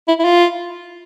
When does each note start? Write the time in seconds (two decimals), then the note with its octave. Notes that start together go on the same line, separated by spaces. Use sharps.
0.08 E4
0.19 E4
0.25 F4